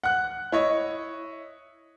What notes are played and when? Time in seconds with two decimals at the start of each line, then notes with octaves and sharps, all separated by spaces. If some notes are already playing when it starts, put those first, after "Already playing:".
0.04 F#5 F#6
0.52 E4 C#5 D#5